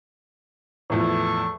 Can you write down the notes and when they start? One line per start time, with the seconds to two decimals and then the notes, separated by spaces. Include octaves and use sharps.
0.90 E2 A2 F3 A4 C#6